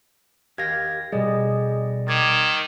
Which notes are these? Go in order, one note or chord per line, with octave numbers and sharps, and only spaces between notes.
G4 A#4 F5 G#6 A#6
B2 G3 G#4 D5 D#5
D#3 D6 G#6 A6